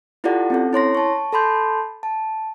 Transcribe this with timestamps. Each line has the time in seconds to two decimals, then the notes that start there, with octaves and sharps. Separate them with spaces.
0.24 E4 F4 G4 A4 D5 F#5
0.50 C4 C#4 A4
0.73 E4 C#5 C6 A#6
0.95 A5 C#6
1.32 A4 A5 B5 C6 G6
2.03 A5